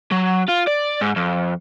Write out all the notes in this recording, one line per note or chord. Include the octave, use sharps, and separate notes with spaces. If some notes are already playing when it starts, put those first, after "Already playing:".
F#3
F4
D5
G#2
F2